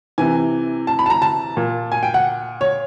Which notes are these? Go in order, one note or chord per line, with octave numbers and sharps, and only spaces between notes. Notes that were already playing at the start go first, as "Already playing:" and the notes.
C3 E3 G#5
A5
B5
A5
A#5
A5
A#2
G#5
G5
F#5
C#5